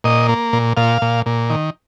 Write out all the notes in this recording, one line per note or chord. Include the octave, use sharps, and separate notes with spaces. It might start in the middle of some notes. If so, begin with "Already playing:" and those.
A#2 D#5
A#3
A#2
A#2 F5
A#2
A#2
D#3